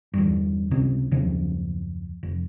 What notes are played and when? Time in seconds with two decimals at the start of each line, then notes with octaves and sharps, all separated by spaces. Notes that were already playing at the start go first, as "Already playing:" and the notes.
0.14 E2 G2
0.71 C#2 C3
1.11 F#1 D#2 C#3 F3
2.23 F1